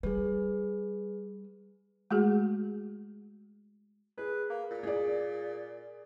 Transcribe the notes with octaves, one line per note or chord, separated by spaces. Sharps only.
G3 G#4 B4
G#3 A3 F#4 G#4
G#4 B4
A#3
A#2
G#4 D5